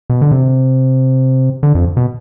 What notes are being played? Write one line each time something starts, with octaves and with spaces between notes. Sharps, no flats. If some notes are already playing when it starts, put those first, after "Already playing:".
B2
D3
C3
D3
F2
B2